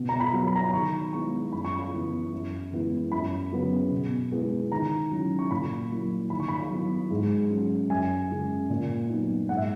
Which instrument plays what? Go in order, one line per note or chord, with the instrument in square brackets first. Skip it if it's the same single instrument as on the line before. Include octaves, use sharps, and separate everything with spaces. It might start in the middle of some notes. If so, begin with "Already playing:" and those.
Already playing: [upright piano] B2
A#5
B5
F#3 B3
B5
A#5
B5
D#3 C#6
G#3 B3 E4 C#6
F#2 B5
C#6
B5
E3 B3 E4
F#2
E3 G#3 B3 E4
F#2 B5
C#3 F#3 B3
B2
G#3 B3 E4
D#3 A#5
F#3 C#4 E4
C#6
A#2 B5
F#3 A#3 E4
D#3 B5
C#6
B5
F#3 B3 E4
G#2
F#3 C#4
F#2 G#5
C#3 G#3
A#2
F#3 B3 D#4
G#2 F#5
E5